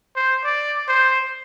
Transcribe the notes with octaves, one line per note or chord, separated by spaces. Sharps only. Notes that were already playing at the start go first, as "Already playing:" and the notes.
C5
D5
C5